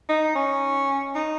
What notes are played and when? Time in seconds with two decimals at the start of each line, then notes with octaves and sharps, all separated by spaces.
0.09 D#4
0.35 C#4
1.15 D#4